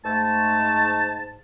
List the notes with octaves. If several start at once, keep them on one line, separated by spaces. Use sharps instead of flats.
G#2 A3 A5